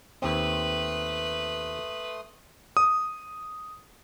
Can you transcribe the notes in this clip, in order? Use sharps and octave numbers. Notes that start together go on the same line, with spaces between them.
D#2 A3 C4 B4 C6 D#6
D#6